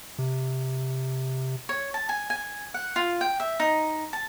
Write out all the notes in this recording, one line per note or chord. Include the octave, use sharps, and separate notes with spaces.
C3
C#5
A5
G#5
G#5
F#5
F4
G5
E5
D#4
A5